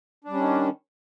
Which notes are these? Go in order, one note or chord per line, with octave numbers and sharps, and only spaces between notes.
D#3 G3 C#4 D4